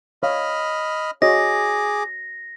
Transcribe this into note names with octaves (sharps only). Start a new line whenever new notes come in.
C#5 D#5 F5 B5 F6
F#4 G#4 C#5 D#5 D6 A#6